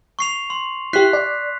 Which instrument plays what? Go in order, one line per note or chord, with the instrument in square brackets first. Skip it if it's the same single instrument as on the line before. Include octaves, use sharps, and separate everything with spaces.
[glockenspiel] C#6 C7 F7
C6
[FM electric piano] E4 G4 [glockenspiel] F#6 B6 C7
[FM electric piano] D5